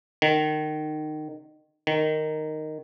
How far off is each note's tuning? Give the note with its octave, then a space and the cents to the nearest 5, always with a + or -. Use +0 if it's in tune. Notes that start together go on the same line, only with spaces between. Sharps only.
D#3 -25
D#3 -10